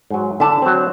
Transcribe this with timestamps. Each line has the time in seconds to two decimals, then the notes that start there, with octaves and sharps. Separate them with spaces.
0.10 G#2 F#3
0.40 D3 E4 A5
0.62 F#3 C4